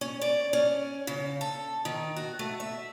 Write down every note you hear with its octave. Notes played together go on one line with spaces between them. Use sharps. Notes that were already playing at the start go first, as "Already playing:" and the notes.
C#4
D5
C#4
C#3
A4
D#3
F#4
A3
E5